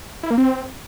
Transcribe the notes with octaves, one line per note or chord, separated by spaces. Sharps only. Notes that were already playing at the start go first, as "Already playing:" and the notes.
E4
A#3
C4